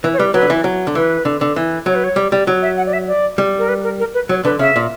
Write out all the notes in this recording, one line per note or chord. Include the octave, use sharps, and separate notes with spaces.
E3 B4
C#5
G3 B4
F#3 B4
D3
E3
F#3
D3
E3 B4
D3
D3
E3
F#3 C#5
B4
C#5
G3
G3
F#3 C#5
E5
F#5
D5
E5
D5
G3
A#4
B4
A#4
A#4
B4
F#3 C#5
D3 B4
C#3 E5
A#2